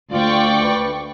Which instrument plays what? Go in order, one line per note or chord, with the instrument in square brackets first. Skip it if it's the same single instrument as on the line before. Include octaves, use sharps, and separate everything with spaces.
[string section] D2 C#6 [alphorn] F4 [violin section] D5 G5
[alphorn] B4